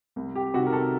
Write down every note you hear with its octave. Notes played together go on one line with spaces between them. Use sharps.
C2
G4
C3 D#3 F#4
A#4
F#4 A4